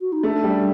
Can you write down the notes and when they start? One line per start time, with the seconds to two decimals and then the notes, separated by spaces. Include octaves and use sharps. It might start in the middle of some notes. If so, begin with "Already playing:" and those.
0.01 F#4
0.12 D#4
0.23 A3 D4
0.44 G3